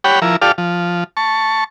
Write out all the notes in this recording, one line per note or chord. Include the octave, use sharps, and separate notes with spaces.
G4 C#5 F#5 G5 B5
F3 E4 A#4
F4 G4 A4 D5 F5
F3
A5 C#6